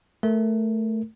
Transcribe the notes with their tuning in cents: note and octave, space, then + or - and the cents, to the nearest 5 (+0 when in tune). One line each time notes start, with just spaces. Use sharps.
A3 +0 A#4 +0